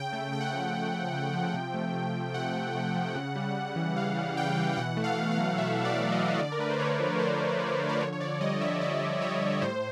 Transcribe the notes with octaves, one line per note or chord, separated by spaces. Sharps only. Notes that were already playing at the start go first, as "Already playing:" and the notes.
Already playing: C#3 G5
A3
C#3 G5
F#5
F3 G5
C#3
A3
C#3
F3
C3
A3
C3
F3
C3 F#5
A3
C3
F3
C#3
G3
C#3
E3
C#3 F5
G3
C#3 G5
E3
B2 F#5
A3
F5
B2
F5
F#3
B2 E5
A3
D5
B2
D#5
F#3
D3 D5
A#4
A3 B4
C5
D3 C#5
F3
D3 C5
A3
D3
F3
D5
D3 C#5
C#5
D3 D5
G3 D#5
G3 E5
D3 D5
D3
G3 C#5
G3
A2 C5